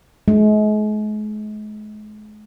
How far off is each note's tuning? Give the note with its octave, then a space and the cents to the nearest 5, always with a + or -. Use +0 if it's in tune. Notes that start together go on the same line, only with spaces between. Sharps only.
G#3 +40